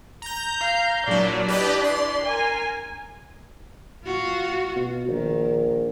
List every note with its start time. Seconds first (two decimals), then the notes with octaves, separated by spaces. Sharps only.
0.22 A#5 G6
0.60 F5
1.07 A#2 F#3 D4 E4 D5
1.48 G4 B4 D#5
1.84 C6
2.24 A#4 G#5
4.05 F4 F#4
4.76 B2
5.09 A#1 D#3